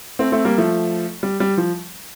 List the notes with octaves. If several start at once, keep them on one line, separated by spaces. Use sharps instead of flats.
A3 C4
A3 C4
G3 A#3
F3 A3
G3
G3
F3